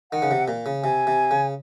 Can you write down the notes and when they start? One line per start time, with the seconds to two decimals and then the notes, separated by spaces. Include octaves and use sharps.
0.12 D#3 F#5
0.22 C#3
0.31 C3
0.48 A#2
0.66 C#3
0.83 C3 G#5
1.07 C3
1.31 C#3